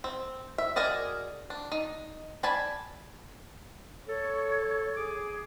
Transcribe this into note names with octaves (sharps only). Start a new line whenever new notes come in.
C4
E5
F#4 G#4 A#4 D5 D#5
D4
D#4
D5 G#5 A5 B5
A4 C#5
G#4 D6